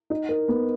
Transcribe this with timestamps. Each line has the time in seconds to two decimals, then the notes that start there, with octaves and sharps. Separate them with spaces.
0.10 D#4
0.29 A#4
0.48 B3